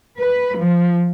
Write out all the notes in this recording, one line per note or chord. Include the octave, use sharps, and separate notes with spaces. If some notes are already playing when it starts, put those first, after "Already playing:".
B4
F3